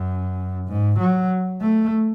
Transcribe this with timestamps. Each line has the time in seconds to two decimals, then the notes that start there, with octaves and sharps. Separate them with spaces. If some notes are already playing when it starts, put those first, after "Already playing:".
Already playing: F#2
0.68 G#2
0.99 F#3
1.61 A3